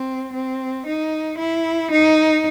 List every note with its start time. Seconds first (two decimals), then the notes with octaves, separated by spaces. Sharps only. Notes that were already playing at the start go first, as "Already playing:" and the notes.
Already playing: C4
0.33 C4
0.86 D#4
1.38 E4
1.91 D#4